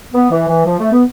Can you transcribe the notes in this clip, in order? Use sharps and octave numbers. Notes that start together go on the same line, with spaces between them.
B3
E3
E3
F3
A3
B3